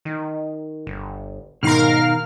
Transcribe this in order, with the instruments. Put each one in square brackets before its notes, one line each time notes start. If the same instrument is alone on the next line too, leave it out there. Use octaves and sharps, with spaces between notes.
[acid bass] D#3
G1
[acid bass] G#2 [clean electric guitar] B2 D#3 [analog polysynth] A#4 F5 F6